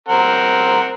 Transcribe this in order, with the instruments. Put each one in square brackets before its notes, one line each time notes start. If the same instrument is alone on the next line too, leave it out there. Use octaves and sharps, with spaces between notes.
[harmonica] C4 A#4 F#5